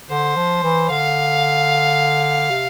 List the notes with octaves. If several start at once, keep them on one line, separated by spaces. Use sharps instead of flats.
D3 C5
F3
E3
D3 F5
C3